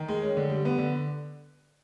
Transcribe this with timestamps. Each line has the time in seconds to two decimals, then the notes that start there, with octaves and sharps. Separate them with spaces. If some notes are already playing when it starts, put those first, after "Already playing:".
Already playing: D#3
0.08 G#3
0.22 C#4
0.37 D3
0.50 G3
0.65 B3
0.79 D3